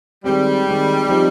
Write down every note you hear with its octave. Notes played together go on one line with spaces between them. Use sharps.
D#3 G3 G#3 C4
D#3 G#3 C4
F3 C4 D#4 G4